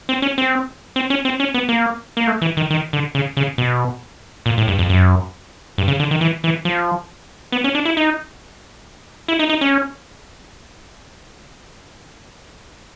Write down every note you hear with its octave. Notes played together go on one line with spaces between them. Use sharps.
C4
C#4
C4
C4
C#4
C4
C#4
B3
A#3
A#3
A3
E3
D#3
D#3
D3
C#3
C#3
B2
A#2
A2
G2
F2
F#2
G2
C#3
D3
D#3
E3
E3
F3
B3
C#4
D4
E4
D#4
E4
D#4
D#4
C#4